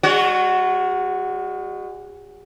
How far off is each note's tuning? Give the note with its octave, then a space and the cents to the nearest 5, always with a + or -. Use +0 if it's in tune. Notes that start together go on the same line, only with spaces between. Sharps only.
G#3 -40 F#4 +0 C#5 +40